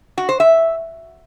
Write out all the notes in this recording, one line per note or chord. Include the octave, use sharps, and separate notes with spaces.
F#4
C5
E5